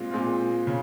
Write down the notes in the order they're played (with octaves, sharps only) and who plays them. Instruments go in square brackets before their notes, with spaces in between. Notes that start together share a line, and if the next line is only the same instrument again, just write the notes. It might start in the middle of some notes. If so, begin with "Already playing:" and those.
Already playing: [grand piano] A#2 G#3 C4 F4
A#2 G#3 C4 F4
C#3